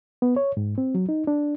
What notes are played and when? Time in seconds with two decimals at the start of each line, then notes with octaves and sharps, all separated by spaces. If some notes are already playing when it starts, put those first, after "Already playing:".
0.22 B3
0.36 C#5
0.57 G#2
0.78 C4
0.95 F#3
1.09 D#4
1.27 D4